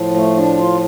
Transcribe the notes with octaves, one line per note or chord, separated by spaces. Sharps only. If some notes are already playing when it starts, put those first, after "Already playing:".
Already playing: A2 F3
A3
D4
F4